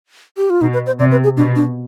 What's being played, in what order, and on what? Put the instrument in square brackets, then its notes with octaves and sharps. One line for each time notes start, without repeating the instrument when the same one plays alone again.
[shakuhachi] G4
F4
[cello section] B2 [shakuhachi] D#4
[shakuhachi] B4
C5
[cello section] C3 [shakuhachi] D5
[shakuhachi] B4
G#4
[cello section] B2 [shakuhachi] D4
[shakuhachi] D4